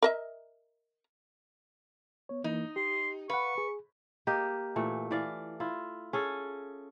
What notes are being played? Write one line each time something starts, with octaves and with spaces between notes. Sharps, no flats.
A#4 D#5 E5
B3 C#5
E3 A#3 D#4
G4 C6
B4 F5 F#5 C#6
G#4
A#3 G4 D#5
A#2 E3 A3
E3 D5 F5
E4 F4
C#4 G#4 A4